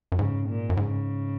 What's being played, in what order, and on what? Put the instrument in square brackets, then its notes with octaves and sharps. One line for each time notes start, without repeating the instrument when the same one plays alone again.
[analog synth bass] F#2
[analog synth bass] G#2 [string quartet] C#3
[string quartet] A#2
[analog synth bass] F#2
[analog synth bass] G#2 [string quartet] C#3